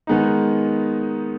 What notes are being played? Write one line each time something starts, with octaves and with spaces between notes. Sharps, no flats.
D#3 G#3 B3 D#4